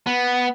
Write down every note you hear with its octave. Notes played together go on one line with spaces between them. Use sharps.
B3